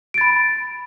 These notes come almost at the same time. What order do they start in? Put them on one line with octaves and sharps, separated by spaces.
D7 A6 B5